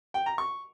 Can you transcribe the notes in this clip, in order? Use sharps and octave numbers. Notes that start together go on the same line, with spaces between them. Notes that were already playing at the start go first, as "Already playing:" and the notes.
G5
A#5
C#6